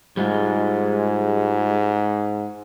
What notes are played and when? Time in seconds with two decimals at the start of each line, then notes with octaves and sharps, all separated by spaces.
0.17 G#2 G3 G#3 F4